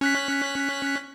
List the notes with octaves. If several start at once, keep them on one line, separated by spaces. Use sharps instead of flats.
C#4 F#6 B6